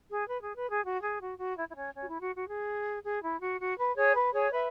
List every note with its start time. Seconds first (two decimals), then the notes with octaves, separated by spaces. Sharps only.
0.09 G#4
0.28 B4
0.42 G#4
0.55 B4
0.70 G#4
0.83 F#4
1.01 G#4
1.20 F#4
1.38 F#4
1.56 E4
1.69 E4
1.75 C#4
1.94 C#4
2.01 F#4
2.08 E4
2.21 F#4
2.35 F#4
2.49 G#4
3.04 G#4
3.22 E4
3.40 F#4
3.59 F#4
3.78 B4
3.95 G#4 C#5
4.15 B4
4.32 G#4 C#5
4.51 B4 E5